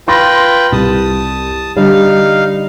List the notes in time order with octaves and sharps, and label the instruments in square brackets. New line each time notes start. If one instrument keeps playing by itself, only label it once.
[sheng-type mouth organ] F4 B4 G5 [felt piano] C6 A6 A#6
[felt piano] C2 [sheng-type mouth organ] A5 D#6
[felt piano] D3 G3 [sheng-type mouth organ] D#4 F5